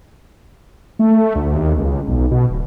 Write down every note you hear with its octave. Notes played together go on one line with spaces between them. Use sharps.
A3
D2
D#2
C#2
B1
B2
D1